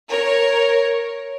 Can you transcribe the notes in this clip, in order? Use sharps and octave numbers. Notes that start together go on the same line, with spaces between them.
A#4 C#5